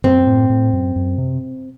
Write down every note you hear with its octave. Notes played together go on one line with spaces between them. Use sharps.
F#2 C4
A2
A2
F#2
F#2
C3